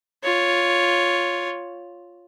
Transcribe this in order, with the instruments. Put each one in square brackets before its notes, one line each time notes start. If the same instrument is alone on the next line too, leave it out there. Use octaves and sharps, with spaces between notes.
[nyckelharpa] F4 C#5